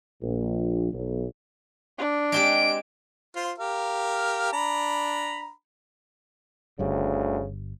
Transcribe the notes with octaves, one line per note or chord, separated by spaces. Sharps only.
A#1
B1
D4
G#3 C4 G4 D7
F4 C5
G4 A#4 F5
D4 A#5 B5
G1 D2 G2 C#3 G3